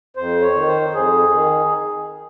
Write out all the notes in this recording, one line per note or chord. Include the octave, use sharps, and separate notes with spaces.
F2 C5
C#5
D#3
C5
F2 G#4
D#3